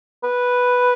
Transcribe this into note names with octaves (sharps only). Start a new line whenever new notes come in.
B4